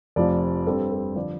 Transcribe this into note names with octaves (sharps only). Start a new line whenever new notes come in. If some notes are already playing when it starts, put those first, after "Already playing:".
F1 F2 F3 D5
G2 G3 C4 A4
A4
D3 F3 D5